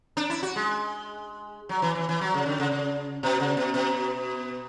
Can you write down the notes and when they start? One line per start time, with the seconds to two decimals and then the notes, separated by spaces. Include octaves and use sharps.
0.17 D4
0.30 E4
0.43 F#4
0.56 G#3
1.69 F#3
1.82 E3
1.95 E3
2.09 E3
2.21 F#3
2.34 C#3
2.46 D3
2.60 C#3
2.72 C#3
3.23 B2
3.40 C#3
3.57 B2
3.74 B2